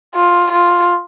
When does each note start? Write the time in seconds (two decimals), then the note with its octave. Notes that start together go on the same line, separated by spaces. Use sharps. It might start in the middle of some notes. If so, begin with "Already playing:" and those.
0.16 F4
0.52 F4